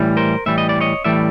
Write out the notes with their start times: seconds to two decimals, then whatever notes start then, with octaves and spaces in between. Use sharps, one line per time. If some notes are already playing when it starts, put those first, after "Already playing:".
Already playing: A2 E3 G3
0.17 A#4 C5
0.46 A2 E3 G3 E5
0.58 D#5
0.69 D5
0.80 C#5 D#5
1.04 A2 E3 G3 D5 E5